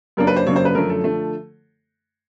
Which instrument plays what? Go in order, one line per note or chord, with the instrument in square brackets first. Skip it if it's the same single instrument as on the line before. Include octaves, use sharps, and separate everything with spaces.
[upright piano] F#2 C#3 F#3 A#3 D4 A#4
B4
C5
F#2 C#3 F#3 A#3 D4 C#5
C5
B4
F#2 D3 F3 A3 A#4
A4
D3 F3 A3